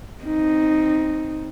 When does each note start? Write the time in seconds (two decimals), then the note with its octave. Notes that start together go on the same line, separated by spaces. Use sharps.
0.24 C4 D#4